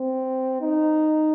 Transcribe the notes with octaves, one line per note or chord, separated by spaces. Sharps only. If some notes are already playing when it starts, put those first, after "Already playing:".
Already playing: C4
D#4